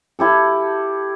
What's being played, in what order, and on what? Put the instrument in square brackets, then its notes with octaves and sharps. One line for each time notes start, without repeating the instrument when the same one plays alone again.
[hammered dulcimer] E4 G4 A4